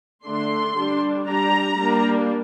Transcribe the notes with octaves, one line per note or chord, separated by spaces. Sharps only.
D3 A3 D4 C6
G3 D4
G3 D4 A#5
G3 A#3 D4